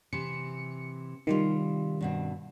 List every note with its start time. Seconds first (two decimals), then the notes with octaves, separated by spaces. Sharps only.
0.13 C3 E3 C#7
1.27 C3 D#3 G3 F4
2.01 G2 B2 C4